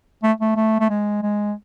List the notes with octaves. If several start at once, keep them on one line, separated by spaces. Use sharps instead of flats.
A3
A3
A3
A3
G#3
G#3